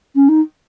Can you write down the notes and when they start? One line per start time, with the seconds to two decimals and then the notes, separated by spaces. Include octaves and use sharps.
0.15 C#4
0.28 D#4